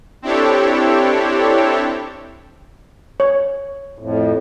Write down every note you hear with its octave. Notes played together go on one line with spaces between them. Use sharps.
C4 D4 E4 G4 A4 C#5
C#5
F2 A2